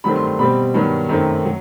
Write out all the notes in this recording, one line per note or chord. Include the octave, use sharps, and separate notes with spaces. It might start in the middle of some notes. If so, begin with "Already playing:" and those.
G2 D#3 F#3 A3 C4 B5
C6
C6
B2 G3 C4 B5
G2 D#3 F#3 B3
F#2 D#3 A3 C4
F#3